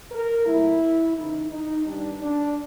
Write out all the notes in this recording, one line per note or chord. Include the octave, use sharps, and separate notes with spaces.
A#4
A#2 F#3 A3 E4
E2 C#3 E3 D#4
D#4
G2 D#3 G3 D4
D4